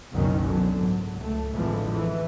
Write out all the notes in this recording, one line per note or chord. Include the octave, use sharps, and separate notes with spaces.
F#1 C2 B2 D#3 F#3 C#4
B2 D3 F#3
G#2 F#3
C#2 A3
A1 F2 D3 E3 F3 G#3
E3